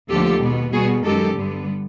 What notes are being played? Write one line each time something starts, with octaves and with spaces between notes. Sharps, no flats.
D#2 D3 F3 A3 G4 A4
B2 G#3 B3
B2 G3 B3 F#4 G#4
F#2 D#3 G#3 G4 A4
G2 D3 G3 B3